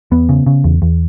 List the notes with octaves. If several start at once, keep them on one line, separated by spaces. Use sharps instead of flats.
E2 B3
C#3
C#3
E2
E2